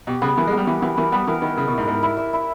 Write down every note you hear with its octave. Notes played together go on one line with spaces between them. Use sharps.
B2 G4
C#3 B3
E3 A#4
G#3
G3 B3
E3 G4
E3 B3
E3 A#4
G3 B3
E3 A#4
D#3 E4
C#3 E5
B2
G#2 E4
G#2 A#4
E4
E5
E4